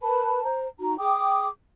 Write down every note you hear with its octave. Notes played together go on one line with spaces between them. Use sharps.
A#4 B4 A5 B5
C5 A#5
D#4 F#4 A#5
G#4 G5 D6 D#6